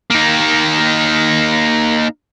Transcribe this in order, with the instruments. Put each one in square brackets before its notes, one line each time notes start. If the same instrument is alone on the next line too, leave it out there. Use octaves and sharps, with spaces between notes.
[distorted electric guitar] A#3 D#4